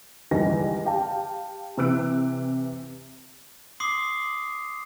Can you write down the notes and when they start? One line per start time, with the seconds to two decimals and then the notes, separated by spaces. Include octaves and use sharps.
0.31 C#2 D#3 E3 G3 G#5 A#6
0.85 G4 F5 G5 A5
1.78 C3 E3 E6 F#6 D7
3.80 C6 D6 D#6 C7